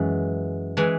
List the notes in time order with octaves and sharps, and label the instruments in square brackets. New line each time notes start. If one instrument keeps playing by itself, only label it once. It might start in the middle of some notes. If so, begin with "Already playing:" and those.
Already playing: [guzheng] F#2 E3 G#3
E3 G#3